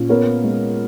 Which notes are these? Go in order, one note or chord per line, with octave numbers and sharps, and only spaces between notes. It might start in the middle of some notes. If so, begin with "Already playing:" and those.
Already playing: A#2 C#4
B3 A#4 C#5
G#3